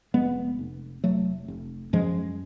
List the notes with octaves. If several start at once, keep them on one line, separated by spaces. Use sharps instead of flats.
F1 G#3 B3
F1
F1 F#3 A3
F1
F#2 F3 G#3